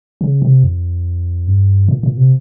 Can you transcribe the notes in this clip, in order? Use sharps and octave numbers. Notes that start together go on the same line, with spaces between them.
C#3
C3
F2
G2
A#2
A#2
C3